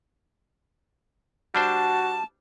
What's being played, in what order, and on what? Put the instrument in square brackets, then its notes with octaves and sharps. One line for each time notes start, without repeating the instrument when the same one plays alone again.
[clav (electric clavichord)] G3 D4 C5 [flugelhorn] F#4 [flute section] A5